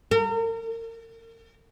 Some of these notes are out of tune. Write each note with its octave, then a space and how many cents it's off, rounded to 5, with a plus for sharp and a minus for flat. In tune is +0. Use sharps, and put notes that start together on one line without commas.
A#4 -35